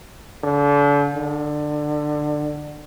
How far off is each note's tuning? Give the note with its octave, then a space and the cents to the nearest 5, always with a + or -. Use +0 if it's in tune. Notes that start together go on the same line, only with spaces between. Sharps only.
D3 -35
D3 +20